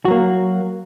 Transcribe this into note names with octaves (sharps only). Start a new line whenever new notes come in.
F#3 A#3 F#4